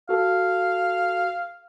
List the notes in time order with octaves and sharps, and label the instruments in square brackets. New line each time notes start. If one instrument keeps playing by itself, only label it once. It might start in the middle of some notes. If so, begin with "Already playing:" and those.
[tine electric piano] F#4 A4 [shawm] F5